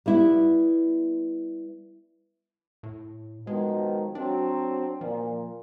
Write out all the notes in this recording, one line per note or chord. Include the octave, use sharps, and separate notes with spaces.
G3 B3 E4
A2
B2 D#3 F3 G#3
F#3 C4 D4
A#2 F3